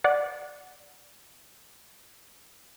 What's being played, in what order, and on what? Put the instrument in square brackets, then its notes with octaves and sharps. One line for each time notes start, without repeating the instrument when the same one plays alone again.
[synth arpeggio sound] D5 F#5